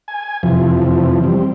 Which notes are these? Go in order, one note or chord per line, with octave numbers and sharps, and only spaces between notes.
G#5
F2 C3 E3 F3
G3 C4